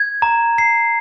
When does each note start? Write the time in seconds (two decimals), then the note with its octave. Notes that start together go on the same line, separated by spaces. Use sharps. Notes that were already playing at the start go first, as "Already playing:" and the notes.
Already playing: G#6
0.22 A#5
0.58 C7